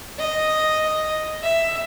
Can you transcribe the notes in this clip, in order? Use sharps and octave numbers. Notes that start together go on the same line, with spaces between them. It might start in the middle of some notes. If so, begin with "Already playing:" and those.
D#5
E5